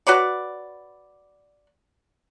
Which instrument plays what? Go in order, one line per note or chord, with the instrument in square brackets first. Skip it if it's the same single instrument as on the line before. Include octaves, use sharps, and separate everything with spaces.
[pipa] F#4 B4 C#5 D5